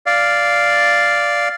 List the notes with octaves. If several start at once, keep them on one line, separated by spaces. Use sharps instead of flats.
D5 F5